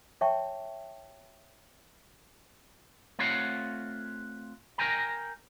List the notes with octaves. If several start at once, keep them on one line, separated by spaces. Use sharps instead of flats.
C#5 E5 G5 A5 C#6
A3 C4 F4 C#5 F5 F#5
A#4 G5 G#5 A#5